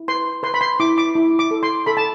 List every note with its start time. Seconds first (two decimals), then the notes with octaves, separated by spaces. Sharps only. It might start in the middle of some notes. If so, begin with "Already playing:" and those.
Already playing: E4
0.08 B4 C6
0.43 B4 C6
0.54 B5
0.61 C6
0.80 E4 D6
0.98 D6
1.15 E4
1.39 D6
1.51 A4
1.63 C6
1.86 A4 B5
1.97 A5